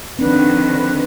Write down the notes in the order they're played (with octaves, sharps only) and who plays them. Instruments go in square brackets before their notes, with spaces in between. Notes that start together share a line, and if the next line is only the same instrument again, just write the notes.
[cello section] D3 D#3 F3 [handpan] C4 D4 [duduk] B4